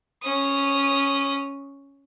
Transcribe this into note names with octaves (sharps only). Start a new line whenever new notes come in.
C#4 D#6